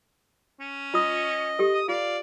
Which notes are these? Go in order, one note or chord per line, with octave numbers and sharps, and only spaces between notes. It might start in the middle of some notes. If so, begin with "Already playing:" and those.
C#4
F4 D#5 D#6
G4 A4
D#6
F4 D5 F5